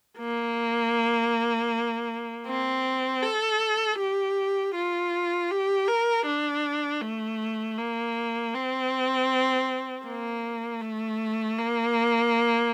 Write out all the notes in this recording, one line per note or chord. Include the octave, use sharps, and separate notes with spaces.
A#3
C4
A4
G4
F4
G4
A#4
D4
A3
A#3
C4
A#3
A3
A#3